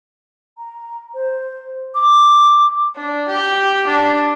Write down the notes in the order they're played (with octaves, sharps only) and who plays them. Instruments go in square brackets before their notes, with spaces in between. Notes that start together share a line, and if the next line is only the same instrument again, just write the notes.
[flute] A#5
C5
D6
[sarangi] D4
G4
D4